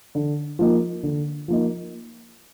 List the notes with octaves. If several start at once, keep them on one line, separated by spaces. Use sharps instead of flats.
D3
F3 A#3 D#4
D3
F3 A#3 D#4